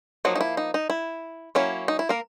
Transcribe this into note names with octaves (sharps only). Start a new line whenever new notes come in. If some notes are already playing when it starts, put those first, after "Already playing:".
F3 F#3 A#3 D#4 F#4
D#4
E4
D#4
D#4
E4
F#3 A#3 C#4 E4
D#4
E4
A#3 A#4